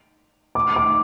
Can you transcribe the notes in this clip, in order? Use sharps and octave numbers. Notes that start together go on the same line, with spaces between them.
D6
D6